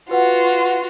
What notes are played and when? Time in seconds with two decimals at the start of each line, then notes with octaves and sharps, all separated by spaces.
0.11 F4 F#4 B4 F#5